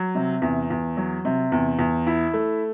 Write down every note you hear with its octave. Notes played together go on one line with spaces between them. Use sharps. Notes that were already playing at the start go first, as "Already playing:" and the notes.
Already playing: F#3
C3
E2
E2
F#3
C3
E2
E2
E4
A3